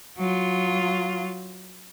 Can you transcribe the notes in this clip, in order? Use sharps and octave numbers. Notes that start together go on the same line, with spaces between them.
F#3 F4